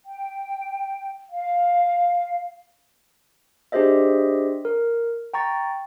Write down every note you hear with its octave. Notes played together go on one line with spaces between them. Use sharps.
G5
F5
D4 G4 G#4 C5 D#5 E5
A#4
G5 A#5 C#6 A6